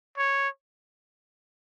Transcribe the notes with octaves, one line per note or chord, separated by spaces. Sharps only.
C#5